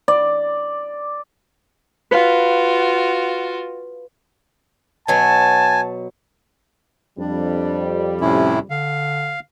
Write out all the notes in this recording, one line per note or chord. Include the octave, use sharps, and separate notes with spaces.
D5
F4 F#4 B4 F5
B2 F#3 G#5 A5
F2 G3 D4
A2 C3 C#4 E4
D3 F5